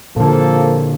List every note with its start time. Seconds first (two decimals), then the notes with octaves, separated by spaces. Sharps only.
0.16 A#2 D3 F3 A#3 A4